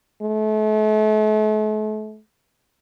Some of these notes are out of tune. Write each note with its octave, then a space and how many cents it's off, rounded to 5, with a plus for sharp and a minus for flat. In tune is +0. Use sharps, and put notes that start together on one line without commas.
A3 -40